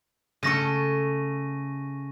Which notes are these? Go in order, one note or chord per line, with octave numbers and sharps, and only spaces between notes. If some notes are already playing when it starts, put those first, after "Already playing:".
C#3 A3 A4 C#6 A#6 D#7